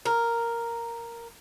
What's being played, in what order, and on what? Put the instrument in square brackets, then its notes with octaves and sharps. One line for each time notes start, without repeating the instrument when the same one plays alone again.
[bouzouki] A#4